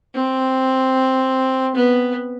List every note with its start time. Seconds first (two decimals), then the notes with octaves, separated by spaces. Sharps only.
0.14 C4
1.75 B3